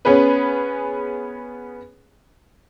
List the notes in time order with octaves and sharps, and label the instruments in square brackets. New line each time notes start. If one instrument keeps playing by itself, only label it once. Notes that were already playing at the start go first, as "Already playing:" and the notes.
[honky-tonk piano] B3 C#4 G#4 B4